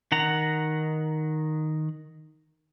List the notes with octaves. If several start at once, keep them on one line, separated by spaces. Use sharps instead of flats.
D#3 F#5 A#5